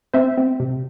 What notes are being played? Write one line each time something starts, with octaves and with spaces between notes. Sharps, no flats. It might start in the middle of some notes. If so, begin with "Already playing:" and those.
C4 C5 E5
C4
C3